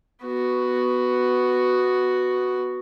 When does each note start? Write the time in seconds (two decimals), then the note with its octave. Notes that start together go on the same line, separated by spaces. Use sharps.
0.25 B3 F#4